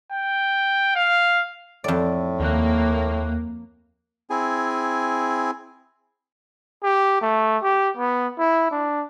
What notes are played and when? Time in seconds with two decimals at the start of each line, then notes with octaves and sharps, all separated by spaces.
0.12 G5
0.95 F5
1.84 F2 A2 D5
2.40 D#2 A#3 F#6
4.30 C4 E4 G#4 G#5
6.83 G4
7.22 A3
7.63 G4
7.97 B3
8.38 E4
8.71 D4